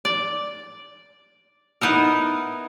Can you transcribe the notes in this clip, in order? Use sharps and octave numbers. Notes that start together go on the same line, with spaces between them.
D5
B3 D#4 E4 A#4